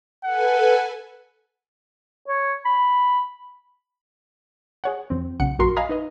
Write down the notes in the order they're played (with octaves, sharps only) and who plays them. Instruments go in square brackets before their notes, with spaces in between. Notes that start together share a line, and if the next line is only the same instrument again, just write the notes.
[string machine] A4 B4 G#5 [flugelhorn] F#5
[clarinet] C#5
B5
[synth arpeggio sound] G#4 C#5 F#5
F2 C4
B1 C#3 F#5 C#7
A#1 F#2 F#4 A#4 C6 C#6
D#5 F5 G#5 A#5 B5 D#6
D#4 B4 D#5